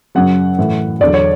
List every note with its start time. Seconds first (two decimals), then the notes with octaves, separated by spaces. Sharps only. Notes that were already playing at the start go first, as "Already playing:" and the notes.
0.15 F#2 C#3 F#3 F#5
0.59 A2 E3
1.00 E2 D3 F#3 D5
1.14 C#5